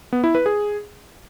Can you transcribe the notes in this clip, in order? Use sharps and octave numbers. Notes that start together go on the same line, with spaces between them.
B3
E4
B4
G#4